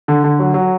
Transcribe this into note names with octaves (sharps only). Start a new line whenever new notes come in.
D3
D3
F#3
F#3